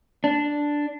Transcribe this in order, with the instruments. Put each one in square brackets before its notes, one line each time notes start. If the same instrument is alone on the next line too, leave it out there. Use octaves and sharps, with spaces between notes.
[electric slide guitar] D4